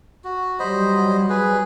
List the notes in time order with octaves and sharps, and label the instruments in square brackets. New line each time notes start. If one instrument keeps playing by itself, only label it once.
[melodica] F#4
[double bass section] F#3 G3 [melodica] C5 D#5 B5
[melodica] G#4 B4